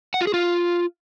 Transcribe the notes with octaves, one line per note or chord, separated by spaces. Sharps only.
F#5
F4
G#4
F4